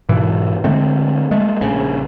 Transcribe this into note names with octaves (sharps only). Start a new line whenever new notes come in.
G#2 B2 E3
D3 G#3 A3 C4
G#3 A3
A#1 C#3